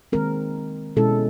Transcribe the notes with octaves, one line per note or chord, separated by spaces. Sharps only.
D#3 G#3 C4 A#4
B2 G#3 C#4 E4 A4